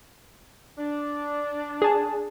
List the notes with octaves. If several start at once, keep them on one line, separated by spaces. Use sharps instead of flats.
D4
G#4 A5